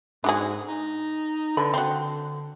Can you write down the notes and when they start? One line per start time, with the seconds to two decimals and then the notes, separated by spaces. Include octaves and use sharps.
0.24 G#2 D4 F#4 G#4
0.68 D#4
1.57 D3 B4
1.74 D3 C4 F#4